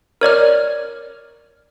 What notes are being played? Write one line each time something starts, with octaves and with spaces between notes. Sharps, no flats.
A#4 C#5 D5 F6